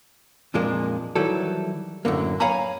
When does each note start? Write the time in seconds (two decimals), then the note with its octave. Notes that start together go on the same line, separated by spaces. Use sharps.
0.54 F2 A#2 F3 G#3 A#3 D4
1.16 D#3 E3 F#3 G3 E4 A4
2.05 F#2 A2 D3 A#3
2.40 C#5 F5 G#5 A#5 B5